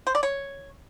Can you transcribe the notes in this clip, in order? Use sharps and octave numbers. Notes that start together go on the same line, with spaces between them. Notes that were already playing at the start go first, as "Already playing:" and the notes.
C5
D5
C#5